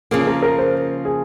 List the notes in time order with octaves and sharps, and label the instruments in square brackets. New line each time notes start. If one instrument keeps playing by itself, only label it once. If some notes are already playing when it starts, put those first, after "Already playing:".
[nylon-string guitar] C#3 F3 A#3 [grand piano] G#4
[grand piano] A#4
A#4
C5
G#4